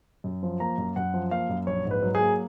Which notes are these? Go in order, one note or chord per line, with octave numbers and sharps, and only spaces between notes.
F#2
F3
A#3 A#5
F#2
F#2 F#5
F3
A#3 F5
F#2
A#1 C#5
G#2
B4
F#3
G#4
A#3